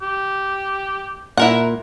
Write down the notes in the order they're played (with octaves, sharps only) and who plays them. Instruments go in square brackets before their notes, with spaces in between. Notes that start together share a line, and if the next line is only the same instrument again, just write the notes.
[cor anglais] G4
[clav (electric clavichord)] A#2 [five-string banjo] E4 A#4 F#5